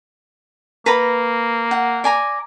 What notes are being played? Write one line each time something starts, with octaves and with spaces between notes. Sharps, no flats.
A#3 B4 A#5 B5
F#5
D5 G#5 A#5